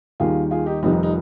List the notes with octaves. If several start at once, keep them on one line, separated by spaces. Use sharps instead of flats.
D#2 D#3 G3 F4 G#4
F4 G#4
D#4 G4
F1 F2 D#3 G3 D#4
D#4
D#4